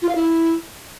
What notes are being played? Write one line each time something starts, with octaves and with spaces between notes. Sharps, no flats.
F4
F5
E4